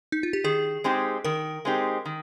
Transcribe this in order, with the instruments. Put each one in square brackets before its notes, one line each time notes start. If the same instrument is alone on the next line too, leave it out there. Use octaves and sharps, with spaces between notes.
[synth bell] D#4
F4
G4
[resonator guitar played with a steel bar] D#3 [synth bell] G#4
[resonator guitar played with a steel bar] G#3 C4 D#4 G4
[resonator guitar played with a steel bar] D#3 [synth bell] A#4
[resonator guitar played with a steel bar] G#3 C4 D#4 G4
D#3